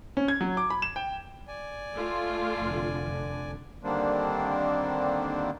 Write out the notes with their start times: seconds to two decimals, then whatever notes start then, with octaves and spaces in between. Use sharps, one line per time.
0.17 C#4
0.28 G#6
0.41 F#3
0.57 D6
0.70 B5
0.82 E7
0.96 G5
1.48 D5 G#5
1.96 A3 F4
2.59 F1 D3
3.84 D3 D#3 G3 A#3 C4 D4